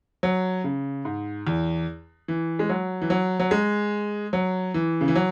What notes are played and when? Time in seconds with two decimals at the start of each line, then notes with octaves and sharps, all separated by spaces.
0.23 F#3
0.64 C#3
1.05 G#2
1.47 E2
2.28 E3
2.59 G#3
2.69 F#3
3.01 E3
3.10 F#3
3.40 F#3
3.51 G#3
4.33 F#3
4.74 E3
5.01 C#3
5.08 E3
5.15 F#3